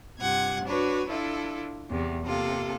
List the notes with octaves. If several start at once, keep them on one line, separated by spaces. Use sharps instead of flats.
G2 C3 F4 F#5 G#6
D4 F#4 B4 C#5
D4 E4 F4 A4
E2 C3
C3 A#3 F4 A4